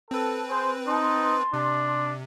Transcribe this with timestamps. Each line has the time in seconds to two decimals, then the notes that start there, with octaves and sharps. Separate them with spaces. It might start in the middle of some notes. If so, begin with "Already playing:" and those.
0.11 C4 A4 B4
0.49 G#4 C5
0.87 D#4 A5 C6
1.53 C3 D4